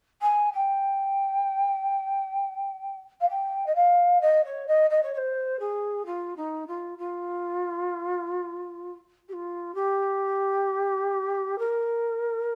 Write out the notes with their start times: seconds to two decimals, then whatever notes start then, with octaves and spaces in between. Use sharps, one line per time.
0.22 G#5
0.53 G5
3.21 F5
3.29 G5
3.66 D#5
3.75 F5
4.21 D#5
4.44 C#5
4.67 D#5
4.90 D#5
5.03 C#5
5.13 C#5
5.17 C5
5.60 G#4
6.05 F4
6.36 D#4
6.67 F4
6.98 F4
9.29 G4
9.33 F4
9.74 G4
11.59 A#4